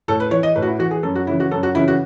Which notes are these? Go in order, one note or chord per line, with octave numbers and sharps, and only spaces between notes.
A2 A4
B4
E3 C#5
D#5
A2 B4
F#4
E4
E3 F#4
G#4
F#2 A4
F#4
C#3 E3 E4
F#4
F#2 A4
F#4
C#3 E3 E4
F#4